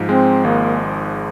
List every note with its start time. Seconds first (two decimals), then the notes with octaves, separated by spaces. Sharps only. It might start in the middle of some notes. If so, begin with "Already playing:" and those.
Already playing: G#2 F3
0.09 G#3 C4
0.44 G#1 A#3